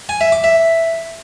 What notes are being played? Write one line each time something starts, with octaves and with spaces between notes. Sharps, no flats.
G#5
E5
D6
E5